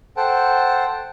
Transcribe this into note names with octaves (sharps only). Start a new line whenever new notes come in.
A4 C5 F#5 G5 A5